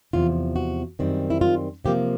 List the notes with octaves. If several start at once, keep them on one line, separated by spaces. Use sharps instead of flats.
E2 C3 F3 F4
F#4
F#2 D#3 G3 C4
E4
F4
C3 F3 A#3 G4